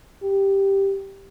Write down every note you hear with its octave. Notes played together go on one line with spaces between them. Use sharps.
G4